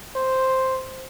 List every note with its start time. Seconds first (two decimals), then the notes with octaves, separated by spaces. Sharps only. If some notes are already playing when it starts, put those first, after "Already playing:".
0.16 C5